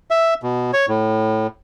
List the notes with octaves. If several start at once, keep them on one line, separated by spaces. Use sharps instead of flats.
E5
B2
C#5
A2